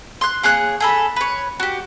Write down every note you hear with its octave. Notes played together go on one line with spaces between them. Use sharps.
C6 F#6
A#3 G#4 C#5 F#6
G#4 A4 B5
B4 C#5
F#4 G4